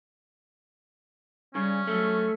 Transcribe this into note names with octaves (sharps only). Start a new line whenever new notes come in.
C#3 G3 C#4
F#3 A3